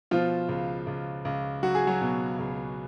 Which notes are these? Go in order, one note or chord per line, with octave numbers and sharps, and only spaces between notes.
B2 F3 F4
C#2
C#2
C#2
F#3 F#4
G#4
F#3 F#4
B2
C#2